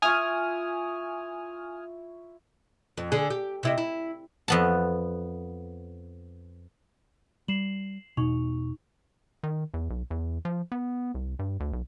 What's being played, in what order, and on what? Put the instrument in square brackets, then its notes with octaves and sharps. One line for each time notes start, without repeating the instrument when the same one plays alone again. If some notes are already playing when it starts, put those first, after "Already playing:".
[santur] E4 F4 C#5 [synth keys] G#5 D#6 F6
[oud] F2
D3 G#4
G4
C3 E4 D#5
E4
[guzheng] F2 B3 A5
[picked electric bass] G3 [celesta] C7 E7 F#7
[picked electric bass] E1 B2 [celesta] D#4 C#6 F7
[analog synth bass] D#3
E2
B1
E2
F3
B3
C2
G2
D2
B1